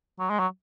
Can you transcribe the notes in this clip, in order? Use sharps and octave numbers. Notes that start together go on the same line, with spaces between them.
F#3
G#3
F#3